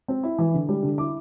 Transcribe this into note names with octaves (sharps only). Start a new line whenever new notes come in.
C4
E4
E3
D3
G3
D3
E4 D6